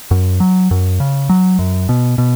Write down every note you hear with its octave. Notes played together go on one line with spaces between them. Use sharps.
F#2
F#3
F#2
C#3
F#3
F#2
B2
B2